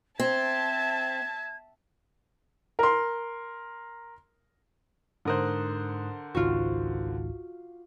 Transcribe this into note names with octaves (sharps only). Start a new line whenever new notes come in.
C4 E5 A5 G#6
A#4 C6
G#2 D3 A#4 C5 D#6 F#6
G#1 C#2 G#2 F4 F#4